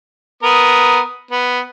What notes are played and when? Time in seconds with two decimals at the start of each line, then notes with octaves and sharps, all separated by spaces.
0.43 B3 A#4 D#6
1.31 B3